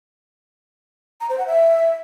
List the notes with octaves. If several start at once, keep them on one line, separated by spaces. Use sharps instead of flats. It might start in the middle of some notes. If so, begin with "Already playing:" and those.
A#5
C5
F#5
E5